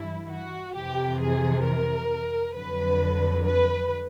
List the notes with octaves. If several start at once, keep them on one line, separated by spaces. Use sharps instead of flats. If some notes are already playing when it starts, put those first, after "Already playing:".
Already playing: G2 E3 E4
F#4
F2 C3 E3 G4
G#4
A#4
F2 D3 F#3 B4
B4